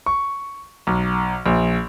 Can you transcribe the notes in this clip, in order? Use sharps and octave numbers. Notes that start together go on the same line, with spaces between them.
C#6
B1
A#1